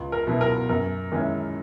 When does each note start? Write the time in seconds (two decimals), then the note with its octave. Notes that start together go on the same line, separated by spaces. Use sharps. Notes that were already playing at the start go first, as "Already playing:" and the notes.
Already playing: C#2
0.12 A#4
0.27 B2 F#3 B3 E4
0.41 A#4
0.69 F#2 A#4
1.12 D#3 G#3 C#4 E4